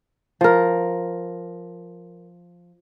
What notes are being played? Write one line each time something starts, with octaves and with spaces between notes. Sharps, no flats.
F3 A#4